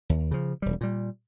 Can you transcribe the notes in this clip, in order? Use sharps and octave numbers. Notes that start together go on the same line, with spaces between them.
D#2
C#3 F3
E1 G3
A#2 G3